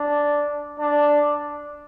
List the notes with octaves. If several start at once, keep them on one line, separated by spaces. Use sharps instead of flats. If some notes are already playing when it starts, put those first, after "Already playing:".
Already playing: D4
D4